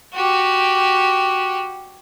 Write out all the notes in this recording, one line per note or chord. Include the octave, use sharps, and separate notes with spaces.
F#4 G4